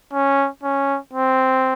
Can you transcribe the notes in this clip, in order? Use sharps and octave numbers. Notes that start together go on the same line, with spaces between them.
C#4
C#4
C4